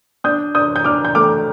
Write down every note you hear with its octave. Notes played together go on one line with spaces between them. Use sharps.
D4 D#6 G6
D4 D#6 G6
G6
D4 D6 F6
G6
A3 D6 F6